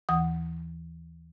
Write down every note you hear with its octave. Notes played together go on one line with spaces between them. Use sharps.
D#2 E3 F#5 D#6